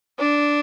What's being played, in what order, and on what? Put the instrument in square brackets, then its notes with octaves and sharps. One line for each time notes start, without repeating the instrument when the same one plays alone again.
[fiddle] D4